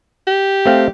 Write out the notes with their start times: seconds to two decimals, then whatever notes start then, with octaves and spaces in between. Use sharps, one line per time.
0.27 G4
0.66 A3 C4 F5